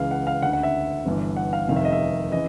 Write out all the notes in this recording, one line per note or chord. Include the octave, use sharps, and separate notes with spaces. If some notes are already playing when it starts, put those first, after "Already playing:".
Already playing: C#2 C#3 E3 F5
F#5
F5
D2 D3 F#5
F#5
E5
G1 G2 E3
F#5
F5
F1 F2 C3 D#3 F5
E5
D#5
E5
C#3 E3 D#5